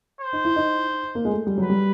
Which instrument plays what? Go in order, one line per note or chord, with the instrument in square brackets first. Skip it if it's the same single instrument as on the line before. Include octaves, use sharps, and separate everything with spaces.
[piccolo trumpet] C5
[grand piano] D#4
E4
D#4
A#3
G#3
A3
G3
[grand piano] F#3 [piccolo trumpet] B4
[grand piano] G3